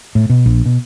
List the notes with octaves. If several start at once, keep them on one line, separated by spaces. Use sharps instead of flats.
A2
B2
A#1
B2